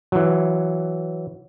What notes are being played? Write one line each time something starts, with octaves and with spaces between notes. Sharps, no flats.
E3 F#3